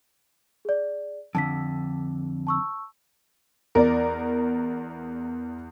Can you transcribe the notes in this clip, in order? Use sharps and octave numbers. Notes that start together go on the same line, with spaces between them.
G#4 D5
F2 D3 A5 B6
A5 C#6 E6
E2 A#4 D5